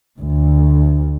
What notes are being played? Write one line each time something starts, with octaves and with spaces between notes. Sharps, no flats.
D2